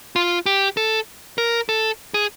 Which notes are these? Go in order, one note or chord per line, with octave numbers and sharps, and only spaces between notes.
F4
G4
A4
A#4
A4
G#4